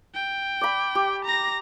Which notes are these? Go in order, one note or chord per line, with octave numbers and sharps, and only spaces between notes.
G5
D5 B5
G4
A#5 A#6